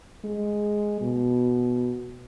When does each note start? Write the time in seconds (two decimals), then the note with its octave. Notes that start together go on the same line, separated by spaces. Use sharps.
0.24 G#3
1.01 B2